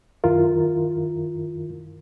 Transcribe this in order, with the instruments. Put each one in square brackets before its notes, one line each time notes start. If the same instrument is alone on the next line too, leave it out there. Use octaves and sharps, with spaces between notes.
[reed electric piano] F#2 D#3 E4 F4 A#4